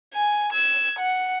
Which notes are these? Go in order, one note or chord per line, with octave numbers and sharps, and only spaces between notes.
G#5
E6 G#6
F#5